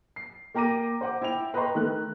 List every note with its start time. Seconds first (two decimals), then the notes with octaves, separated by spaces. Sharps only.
0.16 C7
0.55 A#3 G5 A#5 D6 A#6 D#7
1.01 C5 F#5 D6
1.22 E4 E5 G5 F7
1.54 B4 D#5 G5 A#5 C6 C#6
1.75 D#3 A3 F#6